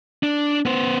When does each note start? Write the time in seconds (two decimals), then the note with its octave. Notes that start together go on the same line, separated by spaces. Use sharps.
0.23 D4
0.66 B3 C5